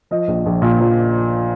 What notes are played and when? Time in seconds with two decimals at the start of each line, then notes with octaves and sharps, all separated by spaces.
0.11 F3 D#5
0.28 A#1
0.46 A#1
0.62 A#2
0.80 F3